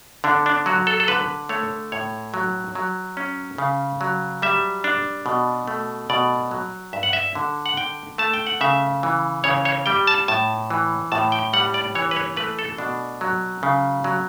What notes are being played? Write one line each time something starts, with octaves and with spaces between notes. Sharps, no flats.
D3 D4
D4
F#3 F#4
A4
A4
D3 B4
A3 C#5
A2 C#5
F#3
F#3
C#4
C#3
F#3
G3 E5
D4
B2
A3
B2 D5
F#3
G2 E5
F#5
E5
D3
F#5
D3 G5
A3 A5
G5
F#5
C#3 E5
E3
C#3 C#5
C#5
G3 G5
A5
A2 A5
E3
A2 A5
G5
G3 F#5
D5
E3 C#5
B4
C#5
A3 B4
A4
B2 D4
F#3
C#3
F#3